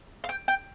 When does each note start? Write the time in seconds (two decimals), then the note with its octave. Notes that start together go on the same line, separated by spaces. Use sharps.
0.24 F5
0.29 G5
0.48 G5